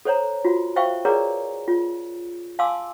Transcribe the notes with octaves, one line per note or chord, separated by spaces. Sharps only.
A4 C5 C#5 A#5
F4 F#4
C5 E5 F5 G5 C#6
G#4 A#4 B4 C#5 D5 A#5
F4
F5 G#5 A5 C6 D6 E6